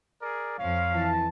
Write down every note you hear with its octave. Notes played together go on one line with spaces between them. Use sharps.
G#4 A#4 D5
F2 F3 C#5 F5
E3 A5